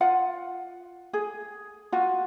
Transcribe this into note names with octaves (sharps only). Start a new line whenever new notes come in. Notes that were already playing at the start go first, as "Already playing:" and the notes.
F4 F#5
G#4
F4 F#4